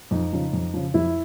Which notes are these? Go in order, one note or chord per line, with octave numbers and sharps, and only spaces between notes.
F2 D#4
C#3 F3
F2
C#3 F3
F2 E4